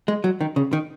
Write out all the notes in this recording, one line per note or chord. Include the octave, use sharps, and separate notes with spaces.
G#3
F#3
D#3
C#3
D#3